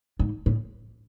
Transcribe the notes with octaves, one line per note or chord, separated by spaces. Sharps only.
G#2
A2